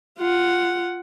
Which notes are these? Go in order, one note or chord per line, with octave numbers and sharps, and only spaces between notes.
F4 F#5